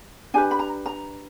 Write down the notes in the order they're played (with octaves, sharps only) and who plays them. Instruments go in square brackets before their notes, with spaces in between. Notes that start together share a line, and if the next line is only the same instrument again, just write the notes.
[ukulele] D4 G4 B4 G#5
B5
A#5
A#5